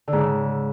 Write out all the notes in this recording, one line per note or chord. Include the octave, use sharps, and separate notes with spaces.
D3
G#2
C#3